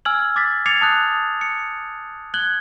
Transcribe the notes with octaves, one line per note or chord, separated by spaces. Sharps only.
G#5 E6 F6 G#6 F#7
D6 A6 B6
D6 G#6 A6 C7 C#7 F7
A5 D#6 F#6
C#7
F#6 G#6 F#7 G7